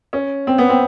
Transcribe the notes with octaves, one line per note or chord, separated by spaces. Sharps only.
C#4
C4
B3
C4